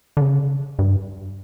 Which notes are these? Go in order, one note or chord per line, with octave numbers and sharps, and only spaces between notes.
D3
C#3
G2